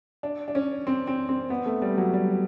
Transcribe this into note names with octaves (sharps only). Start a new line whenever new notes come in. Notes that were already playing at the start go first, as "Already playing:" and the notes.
D4
D4
C#4
C4
C4
C4
B3
A3
G3
F#3
G3